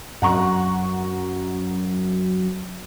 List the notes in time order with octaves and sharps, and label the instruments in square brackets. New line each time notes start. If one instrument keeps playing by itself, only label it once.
[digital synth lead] F#2 [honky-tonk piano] F#5 A#5 C#6